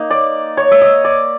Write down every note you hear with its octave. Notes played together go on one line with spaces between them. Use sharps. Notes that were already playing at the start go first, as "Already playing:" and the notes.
Already playing: A#3 D#4
D5
C#5
E5
D#5
D5